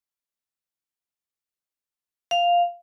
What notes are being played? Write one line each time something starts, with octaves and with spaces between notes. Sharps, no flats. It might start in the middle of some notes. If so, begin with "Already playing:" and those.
F5